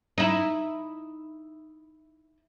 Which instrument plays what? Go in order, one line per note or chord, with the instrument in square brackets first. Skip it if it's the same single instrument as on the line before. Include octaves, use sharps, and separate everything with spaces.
[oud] D#4 E4